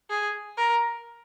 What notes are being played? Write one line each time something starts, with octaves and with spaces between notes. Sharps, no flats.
G#4
A#4